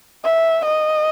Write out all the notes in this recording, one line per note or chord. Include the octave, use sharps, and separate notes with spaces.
E5
D#5